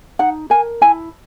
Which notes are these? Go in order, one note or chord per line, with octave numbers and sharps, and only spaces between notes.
D#4 F#5
A#4 G#5
E4 G#5